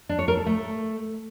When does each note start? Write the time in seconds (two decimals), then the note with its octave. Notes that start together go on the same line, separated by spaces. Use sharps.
0.09 D4
0.19 C#5
0.28 A#4
0.37 A4
0.46 A3